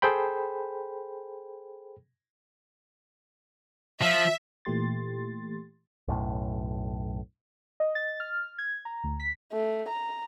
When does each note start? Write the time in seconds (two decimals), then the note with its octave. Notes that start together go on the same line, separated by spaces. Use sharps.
0.02 G#4 A4 C5 G5 B5
4.02 F3 E5
4.65 A#2 E3 A3 G4 C6 A6
6.08 B1 F#2 A2
7.80 D#5
7.95 A6
8.20 F6
8.58 G#6
8.85 A#5
9.04 D2
9.20 B6
9.53 A3
9.89 A#5